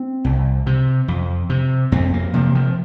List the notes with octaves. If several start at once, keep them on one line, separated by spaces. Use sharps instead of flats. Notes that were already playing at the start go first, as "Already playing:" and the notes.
Already playing: C4
C2
C3
F2
C3
F2 C4
A#3
C3 F3
F3